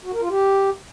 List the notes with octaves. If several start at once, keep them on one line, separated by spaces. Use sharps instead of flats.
F#4
A#4
F4
G4